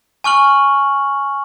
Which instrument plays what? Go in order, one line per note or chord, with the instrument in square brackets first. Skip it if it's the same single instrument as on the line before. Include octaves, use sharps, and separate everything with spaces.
[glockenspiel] G#5 C#6 F6 F#7